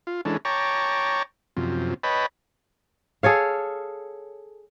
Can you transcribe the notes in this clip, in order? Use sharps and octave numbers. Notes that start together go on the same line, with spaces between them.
F4
E3 G#3 C#4 D4 A4
C#5 G5 A5 A#5 C#6 D6
F#2 C3 F3
B4 C#5 D#5 G5 A5 B5
G#4 A4 C#5 F5